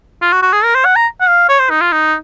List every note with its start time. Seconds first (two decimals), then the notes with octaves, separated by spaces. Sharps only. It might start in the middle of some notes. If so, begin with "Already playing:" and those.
0.22 F4
0.32 F#4
0.42 F#4
0.53 G#4
0.64 A#4
0.75 C5
0.85 F#5
0.96 A#5
1.21 F#5
1.28 F5
1.49 C#5
1.60 C5
1.70 D#4
1.81 F4
1.92 D#4